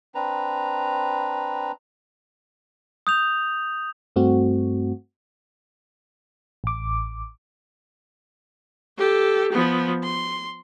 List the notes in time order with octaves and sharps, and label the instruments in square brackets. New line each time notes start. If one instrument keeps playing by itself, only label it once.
[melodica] C4 D4 B4 A#5
[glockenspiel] D#6 G6 F7
[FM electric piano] G2 A3 C4 F#4
A1 D6
[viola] G4 A4
F3 B3
C6